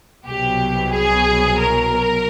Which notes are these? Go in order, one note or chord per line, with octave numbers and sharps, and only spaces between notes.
C2 B2 F#3 G4
G#4
A#4